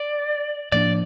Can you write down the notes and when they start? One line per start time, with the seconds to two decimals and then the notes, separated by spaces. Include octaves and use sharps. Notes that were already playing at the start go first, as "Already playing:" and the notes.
Already playing: D5
0.72 A2 F3 A#3 D4 D5